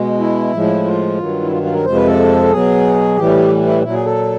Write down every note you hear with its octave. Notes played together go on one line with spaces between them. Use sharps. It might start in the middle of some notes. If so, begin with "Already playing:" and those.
Already playing: B2 G#3
E4
A2 F3 G#3
F4
G2 D#3 F#3
E4
F4
F4
A#4
F2 C3 F3 G#3 C5
B4
A4
B2 F#3 G#4
A2 E3 G3 G4
E4
A#2 F#3 E4
G#4
A4